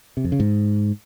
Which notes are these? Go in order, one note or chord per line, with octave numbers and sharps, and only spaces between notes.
C3
F2
C#3
G#2